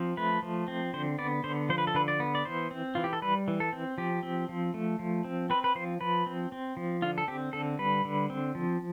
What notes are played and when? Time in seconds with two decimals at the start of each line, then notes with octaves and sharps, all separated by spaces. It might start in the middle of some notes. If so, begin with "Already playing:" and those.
Already playing: F3 C4
0.17 A3 B4
0.42 F3
0.68 C4
0.93 D3 C5
1.18 B3 D5
1.44 D3 C5
1.69 F3 C5
1.78 B4
1.87 A4
1.95 D3 B4
2.08 D5
2.20 B3
2.35 D5
2.45 E3 C5
2.71 C4
2.95 E3 F4
3.04 G4
3.13 A4
3.22 G3 B4
3.48 E3
3.60 A4
3.73 C4
3.98 F3 G4
4.23 C4
4.49 F3
4.74 A3
4.99 F3
5.24 C4
5.50 C4 B4
5.64 B4
5.75 F3 C5
6.01 F3 B4
6.26 C4
6.52 C4
6.77 F3
7.02 D3 F4
7.18 A4
7.28 C4 G4
7.53 D3 A4
7.79 G3 B4
8.05 D3
8.30 C4
8.55 F3